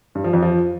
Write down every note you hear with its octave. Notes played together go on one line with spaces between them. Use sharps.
G2
F3
F2
F3